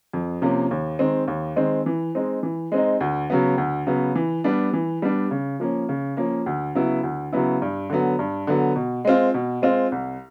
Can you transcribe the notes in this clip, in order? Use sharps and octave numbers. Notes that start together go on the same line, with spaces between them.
F2
C3 F3 A#3 C#4
D#2
D#3 G#3 C4
D#2
D#3 G#3 C4
E3
G#3 C4 D#4
E3
G#3 C4 D#4
D2
C#3 F#3 B3
D2
C#3 F#3 B3
E3
G3 B3 D4
E3
G3 B3 D4
C#3
F3 A#3 C#4
C#3
F3 A#3 C#4
D2
C#3 F#3 B3 E4
D2
C#3 F#3 B3 E4
G2
D3 F#3 B3
G2
D3 F#3 B3
B2
G#3 C4 F4
B2
G#3 C4 F4
C2